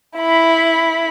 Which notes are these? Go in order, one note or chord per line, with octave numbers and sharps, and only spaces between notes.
E4 B5